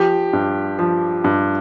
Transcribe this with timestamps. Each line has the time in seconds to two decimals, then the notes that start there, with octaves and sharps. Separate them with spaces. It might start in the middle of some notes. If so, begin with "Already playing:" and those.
Already playing: F3 G4
0.33 G2
0.79 F3
1.24 G2